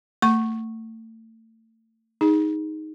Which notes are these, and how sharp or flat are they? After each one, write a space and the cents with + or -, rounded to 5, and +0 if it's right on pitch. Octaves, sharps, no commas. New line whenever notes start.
A3 +35 C#6 -15
D#4 +5 G#4 -15